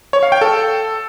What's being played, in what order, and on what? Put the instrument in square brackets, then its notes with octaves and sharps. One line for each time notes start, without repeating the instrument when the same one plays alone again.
[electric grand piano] C#5
F5
G5
A4